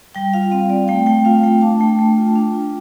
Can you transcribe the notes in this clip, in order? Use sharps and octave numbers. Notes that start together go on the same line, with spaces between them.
G3 G5
F4 F5
C4 F5
C4 D5
A3 G5
A3 G5
F4 F5
A3 G5
D4 A5
A3 G5
A3
F4
D4
F4